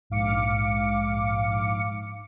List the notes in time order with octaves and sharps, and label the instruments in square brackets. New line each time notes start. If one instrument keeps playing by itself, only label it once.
[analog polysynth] A#1 G#2 F5 D6 C#7